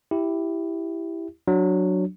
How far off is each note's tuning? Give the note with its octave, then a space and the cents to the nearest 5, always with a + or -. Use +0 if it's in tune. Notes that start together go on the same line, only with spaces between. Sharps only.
E4 +0 G4 +0
F#3 -5 D4 +0